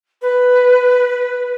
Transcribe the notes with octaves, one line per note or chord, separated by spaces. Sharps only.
B4